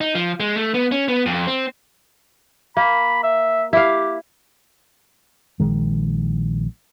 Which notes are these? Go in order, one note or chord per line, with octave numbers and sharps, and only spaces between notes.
D#4
F3
G#3
A3
B3
C#4
B3
F2
C4
A#3 B5
E5
E4 G4 F5
A#1 D#3 G#3